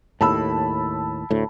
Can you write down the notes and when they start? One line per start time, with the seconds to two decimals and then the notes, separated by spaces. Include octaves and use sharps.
0.21 D#2 A2 A5 B5 E6
1.31 D2 A2